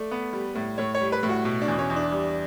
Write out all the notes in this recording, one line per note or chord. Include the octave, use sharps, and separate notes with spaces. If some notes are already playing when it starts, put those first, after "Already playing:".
Already playing: A3 D5
B3
G3
A2
A2 C#5
C#5
G3
B4
A2
F#4
B2
D4
E2
C#4
E2
D4
G3